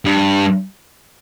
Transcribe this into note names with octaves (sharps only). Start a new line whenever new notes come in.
G2